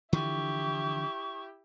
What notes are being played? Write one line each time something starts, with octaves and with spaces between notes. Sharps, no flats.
D3 E3 F3 E4 G4 C#6